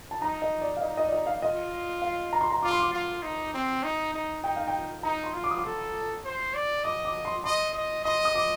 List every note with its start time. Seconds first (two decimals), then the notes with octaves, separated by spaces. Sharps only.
0.11 A5
0.21 D#4 A#5
0.42 D#5
0.61 D5
0.77 F5
0.81 D#4 D#5
0.97 D#5
1.06 D5
1.12 D#5
1.27 F5
1.42 F4 D#5
2.02 F5
2.33 A#5
2.41 C6
2.50 A#5
2.62 F4 D6
2.71 C6
2.80 D6
2.93 F4
3.22 D#4
3.54 C4
3.83 D#4
4.13 D#4
4.44 D#4 G5
4.56 F5
4.67 G5
5.03 D#4 A#5
5.24 C6
5.34 F4
5.44 D6
5.51 D#6
5.58 D6
5.64 A4
6.25 C5
6.54 D5
6.84 D#5 D6
7.05 D6
7.25 C6
7.44 D#5 C6
7.75 D#5
8.05 D#5 C6
8.25 D#6
8.35 D6